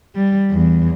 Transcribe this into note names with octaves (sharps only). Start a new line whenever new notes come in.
G3
E2